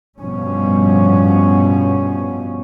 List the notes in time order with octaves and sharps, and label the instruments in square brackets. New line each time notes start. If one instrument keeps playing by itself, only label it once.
[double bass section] G2 B2 F3 C#4